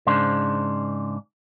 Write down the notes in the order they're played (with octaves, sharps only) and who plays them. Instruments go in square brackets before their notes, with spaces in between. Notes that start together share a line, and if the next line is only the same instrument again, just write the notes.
[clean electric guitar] G#2 C#3 D4 C5